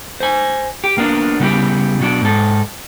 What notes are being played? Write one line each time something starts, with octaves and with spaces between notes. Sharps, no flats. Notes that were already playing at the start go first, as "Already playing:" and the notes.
C5 G#5
G4
A#3 B3 D4
C#3 G3 B3 E4 G4
B2 F#3 D4
G#2 A4